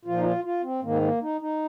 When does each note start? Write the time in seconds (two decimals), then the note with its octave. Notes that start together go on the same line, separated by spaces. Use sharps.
0.05 A#2 F3 F4
0.18 D#4
0.25 F4
0.44 F4
0.63 C4
0.82 G#2 D#3 A#3
1.02 A#3
1.22 D#4
1.41 D#4